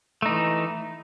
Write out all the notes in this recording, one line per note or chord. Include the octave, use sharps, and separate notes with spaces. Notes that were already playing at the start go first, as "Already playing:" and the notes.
E3 A3 D#4